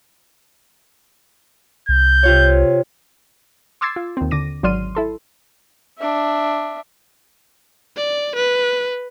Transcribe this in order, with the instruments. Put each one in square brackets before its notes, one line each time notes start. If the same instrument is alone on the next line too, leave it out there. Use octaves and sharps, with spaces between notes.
[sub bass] C2 [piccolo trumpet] G6
[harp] C3 F4 C#5
[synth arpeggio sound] C6 D6 E6 G#6 A6 C7
F4
D#2 C4
D3 D6 A#6 D#7
G#1 F#3 D5 C6 F6 D#7
E4 A4 C6
[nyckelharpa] D4 E5
[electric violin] D5
B4